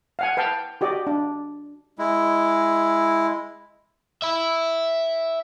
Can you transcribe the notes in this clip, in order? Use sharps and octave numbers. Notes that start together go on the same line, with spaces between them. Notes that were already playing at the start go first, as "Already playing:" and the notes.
F5 F#5 G#5
B4 F5 G5 A5
F#4 G4 D5 D#5
D4
G#3 E4
E5 B5